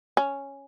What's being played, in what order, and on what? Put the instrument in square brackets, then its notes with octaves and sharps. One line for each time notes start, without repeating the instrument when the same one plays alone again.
[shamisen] C#4